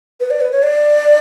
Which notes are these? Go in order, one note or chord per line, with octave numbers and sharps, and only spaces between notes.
B4
D5
B4
C#5
D5